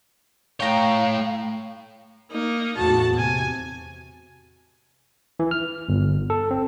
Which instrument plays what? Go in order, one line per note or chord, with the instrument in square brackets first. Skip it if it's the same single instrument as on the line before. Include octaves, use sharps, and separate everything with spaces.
[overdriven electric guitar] A3 C#5 [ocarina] F5 [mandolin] G5 A#5
[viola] A#3 D#4
[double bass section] E2 A2 [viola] F#4 A5
[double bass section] C3 [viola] G#5
[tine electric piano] E3
F6
G1
A4
C4